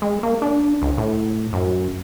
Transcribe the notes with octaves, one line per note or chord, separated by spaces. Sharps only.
G#3
A#3
D4
C#2
A2
F#2